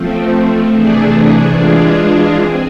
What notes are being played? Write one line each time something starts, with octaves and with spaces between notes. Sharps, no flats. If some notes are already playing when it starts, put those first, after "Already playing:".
Already playing: F3 A3 C4
C3 E3 A3 D4 G#4
E3 G#3 D4 F4 G#4
C4 G#4